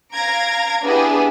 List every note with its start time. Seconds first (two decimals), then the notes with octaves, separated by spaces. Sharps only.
0.13 F5 A#5 G#6 A#6 D7
0.83 B3 D4 E4 G4 G#4 B4